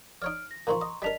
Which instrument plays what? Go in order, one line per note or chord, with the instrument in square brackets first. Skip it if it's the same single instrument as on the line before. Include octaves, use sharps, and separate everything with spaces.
[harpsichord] D#4 C#5 D5 [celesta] F6 D7
[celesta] A#6
[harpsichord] A#2 D#3 F3 [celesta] A#5 C6 C#6
[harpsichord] D#5
[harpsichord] G3 D4 A#4 [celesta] D#5 B6 F7